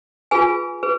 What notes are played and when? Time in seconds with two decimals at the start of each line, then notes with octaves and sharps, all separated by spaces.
0.31 F4 G#4 B4 G#5
0.83 G#4 B4